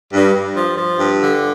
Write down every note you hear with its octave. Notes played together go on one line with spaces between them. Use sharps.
G2
G2
F3
F3
G2
D3